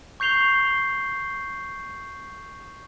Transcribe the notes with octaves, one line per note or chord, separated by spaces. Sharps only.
C#6 G6 C7 F7 G7